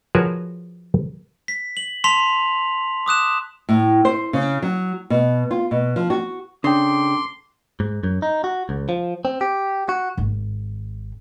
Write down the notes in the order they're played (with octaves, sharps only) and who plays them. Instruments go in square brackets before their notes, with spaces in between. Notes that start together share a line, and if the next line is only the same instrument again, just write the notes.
[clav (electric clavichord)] F3 F#4 G#4 A#4 B4 C#5
[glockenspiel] B6
F#7
A5 C6 B6 F7
D6 D#6 F#6 E7
[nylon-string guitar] A2
C5
C#3
F#3
B2
F4
B2
F3
F#4
[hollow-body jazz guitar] C#3 [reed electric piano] D4 G5 [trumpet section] A4 D6 [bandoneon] C6
[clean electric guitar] G#2
F#2
D#4
F#4
C#2
F3
C4
G4
F#4
[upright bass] G#1